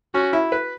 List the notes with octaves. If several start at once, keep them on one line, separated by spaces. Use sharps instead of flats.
C#4 F#4
E4
B4